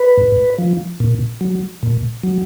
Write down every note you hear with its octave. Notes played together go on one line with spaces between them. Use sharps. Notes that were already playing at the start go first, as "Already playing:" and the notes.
Already playing: B4
G#2
F3
A#2
F#3
A#2
F#3